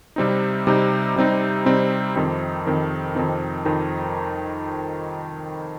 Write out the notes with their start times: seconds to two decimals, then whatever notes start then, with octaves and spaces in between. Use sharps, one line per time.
0.16 C3 G3 C4 D#4
0.67 C3 G3 C4 D#4
1.16 C3 G3 C4 D#4
1.66 C3 G3 C4 D#4
2.16 F2 D#3 C4 D#4
2.66 F2 D#3 C4 D#4
3.15 F2 D#3 C4 D#4
3.65 F2 D#3 C4 D#4